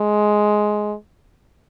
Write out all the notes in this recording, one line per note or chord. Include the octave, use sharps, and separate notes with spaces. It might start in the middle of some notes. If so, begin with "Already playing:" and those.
Already playing: G#3